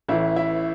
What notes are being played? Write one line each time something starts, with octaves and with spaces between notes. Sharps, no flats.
A1 A2 E3 E4 E5
E4 E5